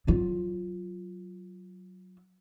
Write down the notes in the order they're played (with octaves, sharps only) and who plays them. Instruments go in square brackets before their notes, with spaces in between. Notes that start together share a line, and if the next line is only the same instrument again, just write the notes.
[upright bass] F#3 F4